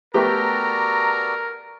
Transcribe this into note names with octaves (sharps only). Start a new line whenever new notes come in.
A3 B3 F#4 G4 A4 A#4 D5 A#5